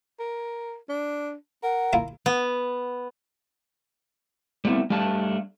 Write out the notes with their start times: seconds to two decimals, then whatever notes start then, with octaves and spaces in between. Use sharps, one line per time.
0.19 A#4
0.89 D4
1.63 A#4 F#5
1.93 A#3 E4 F4
2.26 B3
4.65 G3 A3 B3 C4 E4
4.90 G3 A3 D4 F5 A5